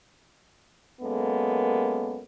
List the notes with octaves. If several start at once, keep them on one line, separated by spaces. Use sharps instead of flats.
F#2 G#3 A#3 B3 A4